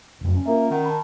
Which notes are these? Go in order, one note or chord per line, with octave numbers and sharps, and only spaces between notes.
F1 F#2
C#4
A#3 F4 A#4 E5
D#3 F#5
A5 B5